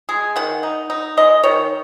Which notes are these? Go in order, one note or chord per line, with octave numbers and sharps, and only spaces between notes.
G#3 G#4
D#3 F#5
D#4
D#4
G#3 D#5
D#3 C#5